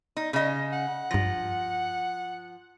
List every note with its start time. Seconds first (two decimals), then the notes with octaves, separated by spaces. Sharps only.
0.17 D#4
0.33 C#3 D#5
0.73 F#5
1.11 G2 F3 A#6